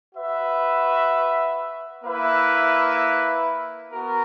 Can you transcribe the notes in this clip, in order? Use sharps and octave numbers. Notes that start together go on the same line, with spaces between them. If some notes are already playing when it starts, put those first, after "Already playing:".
F#4 B4 E5
A#3 E4 B4 E5
B3 F#4 A#4